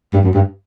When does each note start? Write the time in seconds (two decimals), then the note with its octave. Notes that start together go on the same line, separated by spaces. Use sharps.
0.13 G2
0.24 F#2
0.34 G2